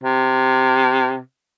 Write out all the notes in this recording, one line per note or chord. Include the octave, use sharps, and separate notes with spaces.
C3